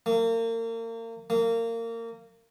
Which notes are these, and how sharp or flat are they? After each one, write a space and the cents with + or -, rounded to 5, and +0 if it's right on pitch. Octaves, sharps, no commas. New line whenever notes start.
A#3 -35
A#3 -25